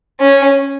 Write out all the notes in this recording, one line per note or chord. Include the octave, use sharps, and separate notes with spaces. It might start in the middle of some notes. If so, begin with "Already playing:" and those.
C#4